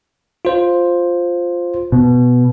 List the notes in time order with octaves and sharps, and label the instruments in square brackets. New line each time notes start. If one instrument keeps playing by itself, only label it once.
[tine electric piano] F4 C5
[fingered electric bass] B2